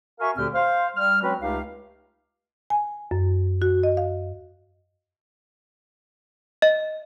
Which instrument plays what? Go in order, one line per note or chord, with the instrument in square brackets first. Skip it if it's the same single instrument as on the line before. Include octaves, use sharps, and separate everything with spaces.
[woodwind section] F#4 A#4 E5 F5 G#5 C#6
D2 A#2 D3 C4 G4 F6
C5 F5
G3 F6
F#3 G#3 C4 C#4 F#4 B4
C#2 A3 D#4 G4 F5
[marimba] G#5
F#2
F#4
D#5
F5
[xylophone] D#5